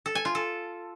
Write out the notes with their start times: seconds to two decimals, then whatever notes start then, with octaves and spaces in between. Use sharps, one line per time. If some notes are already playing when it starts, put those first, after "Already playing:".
0.06 A4
0.15 G#5
0.25 F4
0.35 A4